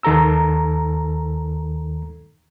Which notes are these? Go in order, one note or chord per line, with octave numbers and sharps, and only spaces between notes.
D#2 D#3 A4 A#5 E6